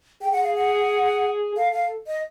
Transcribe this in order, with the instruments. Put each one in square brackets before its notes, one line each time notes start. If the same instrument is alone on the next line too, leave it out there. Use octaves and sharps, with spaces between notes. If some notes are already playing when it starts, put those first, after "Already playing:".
[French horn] G#4 [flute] G5
[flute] F#5
F5
F#5
[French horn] A4 [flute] F5
[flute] F5
D#5